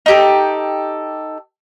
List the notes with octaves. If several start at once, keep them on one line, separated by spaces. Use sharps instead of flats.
D#4 G4 A4